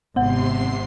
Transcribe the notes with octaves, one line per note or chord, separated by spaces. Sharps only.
G#1 C3 B3 F#5 C6 C7